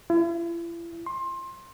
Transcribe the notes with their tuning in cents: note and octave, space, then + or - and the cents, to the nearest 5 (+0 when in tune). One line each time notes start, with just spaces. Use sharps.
E4 +40
C6 +20